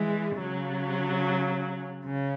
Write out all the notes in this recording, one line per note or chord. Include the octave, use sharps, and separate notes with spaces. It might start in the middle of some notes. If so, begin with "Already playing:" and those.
Already playing: E3 G#3
C#3 F#3
C#3